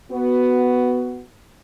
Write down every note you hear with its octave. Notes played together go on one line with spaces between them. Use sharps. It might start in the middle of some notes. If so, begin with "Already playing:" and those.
B3 F#4